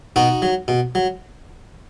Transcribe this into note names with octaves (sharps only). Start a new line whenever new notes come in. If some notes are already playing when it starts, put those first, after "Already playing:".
B2 D#4 F#4
F#3
B2
F#3